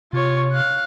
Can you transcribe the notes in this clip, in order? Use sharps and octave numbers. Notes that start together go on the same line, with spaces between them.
C3 F4 C#5
F5 F#6